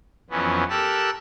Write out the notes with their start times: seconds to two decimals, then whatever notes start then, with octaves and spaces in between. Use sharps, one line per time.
0.30 F2 E3 F#3 B3 C#4
0.70 G4 A4 A#4 A5 E6 F#6